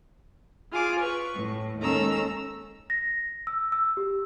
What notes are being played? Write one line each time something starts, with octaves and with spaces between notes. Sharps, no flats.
F4 G#4 D6
B4 C#6
A2
D#2 G#3 C#4 A4 A#5 E6
A#6
E6
E6
G4